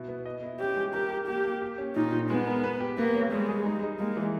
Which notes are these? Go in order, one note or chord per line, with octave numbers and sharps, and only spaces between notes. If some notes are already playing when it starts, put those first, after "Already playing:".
Already playing: B2 E4
B3
D#5
E4
C#4 G4
G#3
G4 A#4
A#4
A#3 G4
A#3
G4
C#4
A#2 D#4
A#2
G#3 B3
A#4
B4
G4
A#3 B3
C#5
G3 G#3
G#4
D#4
D#4
G#3 A#3
E3